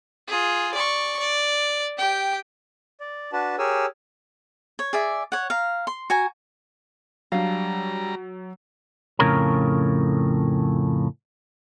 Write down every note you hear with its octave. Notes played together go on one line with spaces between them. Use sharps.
F4 G#4
D5 C#6
D5
G4 G5
D5
D4 F#4 B4 A5
G4 G#4 A#4 C#5 G#5 E6
C#5
G#4 D5 E5
C#5 F#5
F5 A#5
C6
F#4 G#5 A#5
F#3 G3 D4 F5 A#5
F2 A2 C#3 A#4 C#5 A#5